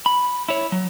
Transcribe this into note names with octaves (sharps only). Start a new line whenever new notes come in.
B5
E4 C#5
F#3